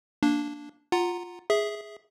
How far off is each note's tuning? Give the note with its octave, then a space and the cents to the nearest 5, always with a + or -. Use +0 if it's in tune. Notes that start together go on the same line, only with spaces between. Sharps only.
A#3 +0 D4 -5
F4 +10 F#5 +0 A#5 -5
G#4 +0 E5 -10